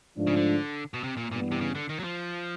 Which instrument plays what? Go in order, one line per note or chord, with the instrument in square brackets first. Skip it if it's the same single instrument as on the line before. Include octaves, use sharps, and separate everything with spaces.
[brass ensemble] G#2 F3 A3 D4
[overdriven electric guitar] C#3
D3
B2
C3
A#2
[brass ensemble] G2 E3 G3 B3 [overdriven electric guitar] A#2
[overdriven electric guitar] C3
C#3
D3
D#3
F#3
F3